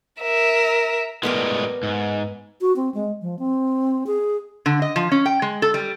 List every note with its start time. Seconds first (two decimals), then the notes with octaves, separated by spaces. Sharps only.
0.21 A#4 E5
1.23 A2 G3 G#3 B3 A#4 D6
1.83 G#2
2.61 F#4
2.76 C4
2.94 G#3
3.22 F3
3.39 C4
4.07 G#4
4.66 D3
4.82 D#5
4.96 F3
5.12 C#4
5.26 G5
5.42 G#3
5.62 A4
5.74 G3